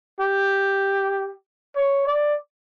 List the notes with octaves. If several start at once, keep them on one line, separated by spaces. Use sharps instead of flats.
G4
C#5
D5